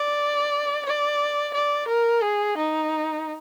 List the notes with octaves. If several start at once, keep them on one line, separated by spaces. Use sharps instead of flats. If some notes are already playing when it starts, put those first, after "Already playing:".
Already playing: D5
D5
D5
A#4
G#4
D#4